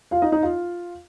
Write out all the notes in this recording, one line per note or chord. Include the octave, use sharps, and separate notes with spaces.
F4 F5
D#4 D#5
D#4 D#5
F4 F5